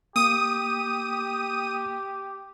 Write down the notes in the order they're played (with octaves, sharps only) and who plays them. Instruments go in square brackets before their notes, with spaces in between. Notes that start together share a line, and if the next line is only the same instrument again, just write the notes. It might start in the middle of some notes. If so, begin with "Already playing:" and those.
[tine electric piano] A#3 [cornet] G4 [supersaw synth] D#6 D#7